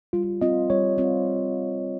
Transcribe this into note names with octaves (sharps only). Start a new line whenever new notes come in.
G3 F4
C4 F4 D#5
G3 C#5
C4 F4